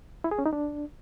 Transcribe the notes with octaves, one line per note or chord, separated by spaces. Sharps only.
E4
G#4
C#4
D#4
D4